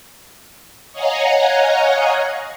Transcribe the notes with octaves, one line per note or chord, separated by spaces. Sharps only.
C#5 D#5 F5 F#5 G#5 A#5